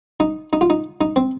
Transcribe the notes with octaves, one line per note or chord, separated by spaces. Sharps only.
D#4
D#4
F4
D#4
D#4
C4